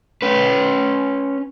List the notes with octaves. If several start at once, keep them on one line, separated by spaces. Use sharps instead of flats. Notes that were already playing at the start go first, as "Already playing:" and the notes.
C#4 B4